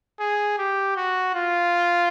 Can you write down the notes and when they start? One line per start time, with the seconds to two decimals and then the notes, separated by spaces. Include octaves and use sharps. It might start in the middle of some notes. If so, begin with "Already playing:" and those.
0.19 G#4
0.58 G4
0.96 F#4
1.34 F4